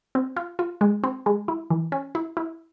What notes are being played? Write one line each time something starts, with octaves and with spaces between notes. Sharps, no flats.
C4
F4
F4
G#3
C4
G#3
E4
E3
C#4
E4
E4